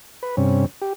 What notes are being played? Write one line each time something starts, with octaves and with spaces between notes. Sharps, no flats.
B4
G2 C3 C#4
G4